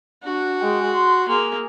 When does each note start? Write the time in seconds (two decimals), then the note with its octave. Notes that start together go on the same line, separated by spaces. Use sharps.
0.23 D4 F#4
0.61 G#3 G5
0.92 C6
1.29 A#3 G#4